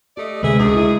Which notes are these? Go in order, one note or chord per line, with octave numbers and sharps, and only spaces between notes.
A3 G4 D5 D#5
D2 C3 G#3 G#4 B4 E5
C#2 F#2 D4 G#4
E4